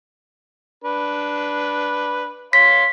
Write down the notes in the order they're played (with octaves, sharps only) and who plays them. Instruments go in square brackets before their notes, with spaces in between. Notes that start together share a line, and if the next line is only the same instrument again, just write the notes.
[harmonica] D4 B4
[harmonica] C#5 F5 C6 [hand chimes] B6